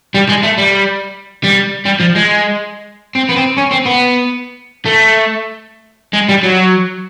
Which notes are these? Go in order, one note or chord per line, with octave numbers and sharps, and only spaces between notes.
G3
G#3
A3
G3
G3
G3
F3
G#3
C4
B3
C4
C#4
C4
B3
A3
G#3
G3
F#3